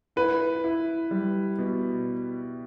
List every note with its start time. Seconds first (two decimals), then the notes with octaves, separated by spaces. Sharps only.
0.16 E4 B4
0.64 E4
1.11 G3
1.58 B2